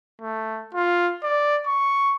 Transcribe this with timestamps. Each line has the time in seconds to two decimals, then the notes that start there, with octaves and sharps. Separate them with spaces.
0.21 A3
0.74 F4
1.23 D5
1.67 C#6